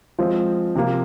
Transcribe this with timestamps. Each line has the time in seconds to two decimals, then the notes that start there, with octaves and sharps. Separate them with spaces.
0.19 F3 G#3 C4 F4
0.76 C3 F3 A#3